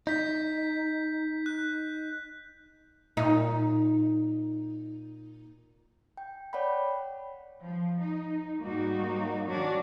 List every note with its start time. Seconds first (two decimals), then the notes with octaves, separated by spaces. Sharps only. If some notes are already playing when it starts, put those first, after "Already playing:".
0.07 D#4 G6 B6
1.46 F#6
3.17 A#2 D#4
6.17 G5
6.53 C#5 D5 F#5 G5 B5
7.61 F3
7.99 D#4
8.62 G#2 F#3 G3 A#3 D#4 F#4
9.46 D#3 F#3 C#4 D4 F#4